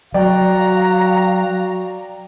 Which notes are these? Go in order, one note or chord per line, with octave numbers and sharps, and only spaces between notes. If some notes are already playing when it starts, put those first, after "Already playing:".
F#3 F#4 D5 F5 G5 A#5